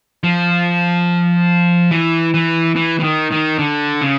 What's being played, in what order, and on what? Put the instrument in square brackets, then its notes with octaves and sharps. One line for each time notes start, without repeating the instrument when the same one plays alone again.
[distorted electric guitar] F3
E3
E3
E3
E3
D#3
D#3
D3
C#3